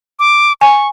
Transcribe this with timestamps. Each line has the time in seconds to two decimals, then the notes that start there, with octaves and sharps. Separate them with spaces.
0.19 D6
0.61 G#5 C#6